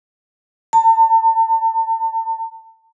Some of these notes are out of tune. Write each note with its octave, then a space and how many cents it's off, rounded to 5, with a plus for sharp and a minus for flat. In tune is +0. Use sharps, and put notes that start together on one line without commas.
A5 +35